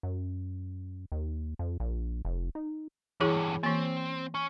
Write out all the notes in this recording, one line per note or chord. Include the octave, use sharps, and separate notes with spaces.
F#2
D#2
F2
A#1
F1
D#4
E2 G2 E3 E4 G#4
E3 A#3 C4
C#4